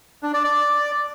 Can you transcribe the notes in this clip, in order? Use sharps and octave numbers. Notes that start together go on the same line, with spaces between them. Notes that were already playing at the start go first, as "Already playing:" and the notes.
D4
D5
D5